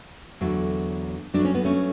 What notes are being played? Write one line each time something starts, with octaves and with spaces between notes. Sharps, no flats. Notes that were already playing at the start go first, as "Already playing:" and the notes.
E2 D3 F#3 A3
G2 F#3 A3 D4
C#4
B3
A3 C#4